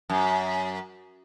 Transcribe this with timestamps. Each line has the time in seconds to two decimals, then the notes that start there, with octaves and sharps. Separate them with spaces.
0.10 F#2